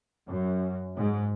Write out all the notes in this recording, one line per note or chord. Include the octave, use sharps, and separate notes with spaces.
F#2
G#2